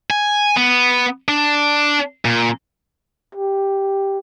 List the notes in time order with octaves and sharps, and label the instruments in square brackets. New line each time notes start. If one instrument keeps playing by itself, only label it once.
[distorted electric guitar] G#5
B3
D4
A#2
[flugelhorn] G4